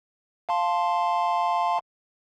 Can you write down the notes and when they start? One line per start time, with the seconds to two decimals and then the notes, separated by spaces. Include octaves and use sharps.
0.49 F5 A5 C6